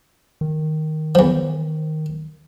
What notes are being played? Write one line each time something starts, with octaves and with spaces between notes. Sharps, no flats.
D#3
E2 F3